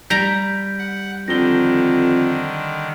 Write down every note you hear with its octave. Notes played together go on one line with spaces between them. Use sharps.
G3 A#5 G6 B6 D7
F#5
F2 D3 D#3 A#6 G7